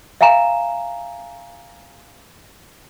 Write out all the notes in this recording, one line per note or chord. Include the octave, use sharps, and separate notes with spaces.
E5 F5 G#5 A#5 E7